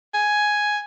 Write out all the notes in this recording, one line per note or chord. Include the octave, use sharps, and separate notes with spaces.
G#5